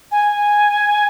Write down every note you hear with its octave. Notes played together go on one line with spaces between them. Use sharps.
G#5